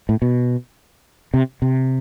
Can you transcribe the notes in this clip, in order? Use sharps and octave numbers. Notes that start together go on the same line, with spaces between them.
A2
B2
C3
C3